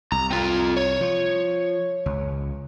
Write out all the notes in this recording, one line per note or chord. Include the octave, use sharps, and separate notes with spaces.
C2 A#5
C4 F4
C#5
F3
C#2